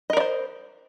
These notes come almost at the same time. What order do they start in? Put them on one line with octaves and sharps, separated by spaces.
D#5 A#4 D5 C5